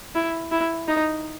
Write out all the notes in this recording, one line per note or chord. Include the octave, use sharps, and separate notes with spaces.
E4
E4
D#4